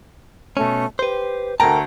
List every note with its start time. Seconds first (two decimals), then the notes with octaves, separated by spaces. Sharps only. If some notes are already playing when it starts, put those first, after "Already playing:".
0.57 B2 A3 C#4
0.99 G4 B4 C5
1.60 D2 A3 A#4 G5 A5 A#5